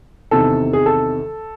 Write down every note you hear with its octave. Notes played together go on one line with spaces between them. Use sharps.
E2 C3 D#3 A4
G#4
A4